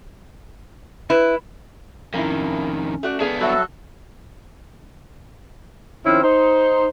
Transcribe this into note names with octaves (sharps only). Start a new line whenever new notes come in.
E4 B4
F2 D#3 A#3 C#4 E4
A3 F#4 D5
B3 D4 G#4 F5
F#3 G3 F#4 A4 E5 F#6
D#3 F3 C4 C#4 E4
D#4 C5